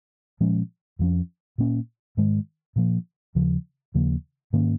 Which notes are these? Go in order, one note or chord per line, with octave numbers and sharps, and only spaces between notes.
A#2 F3 G#3 C#4
F2 F3 C#4
A#2 A#3 C#4
G#2 D#3 G#3
A#2 F3 A#3
D#2 C#3 F3
D#2 C#3 F3 A#3
G#2 D#3 A#3 C#4